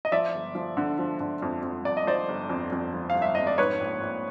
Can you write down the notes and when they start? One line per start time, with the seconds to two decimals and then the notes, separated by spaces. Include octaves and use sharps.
0.05 D#5
0.12 F3 D5 E5
0.34 G1
0.55 F3
0.77 D3
0.99 F3
1.20 D3
1.42 F2
1.63 F2
1.85 F2 D5
1.97 D#5
2.07 F3 C5 D5
2.28 G1
2.49 F2
2.72 F2
2.93 F3
3.10 G1 F5
3.22 E5
3.35 F2 D#5
3.47 D5
3.58 G#2 B4 C#5
3.80 A#1
4.01 A#1